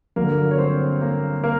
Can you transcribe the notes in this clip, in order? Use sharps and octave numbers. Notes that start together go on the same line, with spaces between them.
G1 G2 D3 F#3 A#3 A#4
C#5
C4 C5
A#3 A#4
A#3 A#4